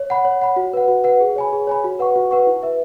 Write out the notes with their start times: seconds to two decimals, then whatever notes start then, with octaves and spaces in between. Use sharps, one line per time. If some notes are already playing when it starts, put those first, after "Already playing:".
Already playing: C#5
0.10 F#5 B5
0.25 C#5
0.41 F#5 B5
0.56 F#4
0.73 B4 F#5
0.88 F#4
1.04 B4 F#5
1.20 G#4
1.36 C#5 G#5 B5
1.53 G#4
1.67 C#5 G#5 B5
1.84 F#4
1.99 B4 F#5 C#6
2.16 F#4
2.31 B4 F#5 C#6
2.47 E4
2.63 B4 E5